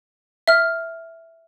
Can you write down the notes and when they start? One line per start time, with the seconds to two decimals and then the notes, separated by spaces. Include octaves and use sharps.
0.48 E5 F6